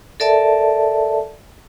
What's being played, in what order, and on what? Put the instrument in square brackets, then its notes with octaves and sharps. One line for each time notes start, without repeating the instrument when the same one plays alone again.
[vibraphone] A4 A#4 D5 E5 A5